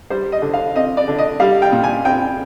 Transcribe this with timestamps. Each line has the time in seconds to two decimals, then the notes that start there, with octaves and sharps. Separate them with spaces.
0.10 G3 C5
0.32 D#5
0.42 D3
0.53 F5
0.75 C4 D#5
0.97 D5
1.08 D3
1.18 D#5
1.40 G3 F5
1.62 G5
1.72 A#2
1.84 G#5
2.05 C4 G5